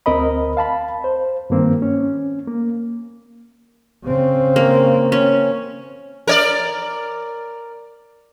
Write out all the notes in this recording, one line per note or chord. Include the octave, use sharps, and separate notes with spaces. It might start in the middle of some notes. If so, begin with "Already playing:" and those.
D2 C4 A#4 D#5 B5
F5 A5 B5
C5
G2 D#3 A#3 C4
C#4
A#3
C#3 C4
A#3
C#4
A#4 C#5 D5